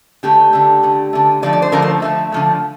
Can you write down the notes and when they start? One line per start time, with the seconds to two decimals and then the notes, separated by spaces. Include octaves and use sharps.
0.23 D3 A3 G4
0.53 D3 A3
0.83 D3 A3
1.13 D3 A3
1.42 D3 F3 A3 D5
1.53 D5
1.62 C5
1.72 D3 F3 A3 A#4
1.82 C5
2.02 D3 F3 A3 E5
2.32 D3 F3 A3